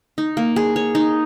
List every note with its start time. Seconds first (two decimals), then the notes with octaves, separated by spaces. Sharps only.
0.18 D#4
0.37 A#3
0.56 G#4
0.76 C#5
0.95 D#4